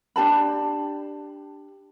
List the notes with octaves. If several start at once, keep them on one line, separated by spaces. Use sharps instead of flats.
D4 G4 A5 B5